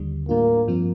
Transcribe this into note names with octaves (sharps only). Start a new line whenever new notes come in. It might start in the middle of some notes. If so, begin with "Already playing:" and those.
Already playing: D#2 D3 G3
A2 G3 A#3 D4 F4
G2 F3 C4 F4